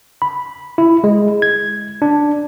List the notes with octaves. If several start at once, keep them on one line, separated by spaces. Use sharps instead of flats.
B5
E4
G#3
G#6
D4